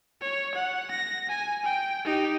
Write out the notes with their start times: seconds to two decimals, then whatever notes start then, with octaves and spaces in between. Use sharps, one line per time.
0.21 C#5
0.55 F#5
0.91 A#6
1.29 G#5
1.65 G5
2.04 D#4 G4